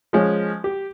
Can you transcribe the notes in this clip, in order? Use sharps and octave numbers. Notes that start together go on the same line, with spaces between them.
F3 G#3 C#4
G4